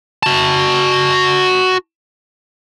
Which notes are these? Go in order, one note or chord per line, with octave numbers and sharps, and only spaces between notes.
F#4 A5